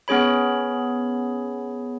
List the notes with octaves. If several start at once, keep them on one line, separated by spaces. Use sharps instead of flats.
B3 C#4 G#4 C#5 B5